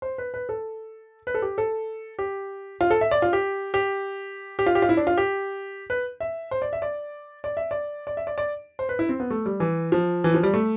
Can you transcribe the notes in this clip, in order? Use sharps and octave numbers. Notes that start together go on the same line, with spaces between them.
C5
B4
B4
A4
B4
A4
G4
A4
G4
F4
A4
E5
D5
F4
G4
G4
G4
F4
G4
F4
E4
D4
F4
G4
B4
E5
C5
D5
E5
D5
D5
E5
D5
D5
E5
D5
D5
C5
B4
E4
C4
B3
A3
G3
E3
F3
E3
F3
G3
A3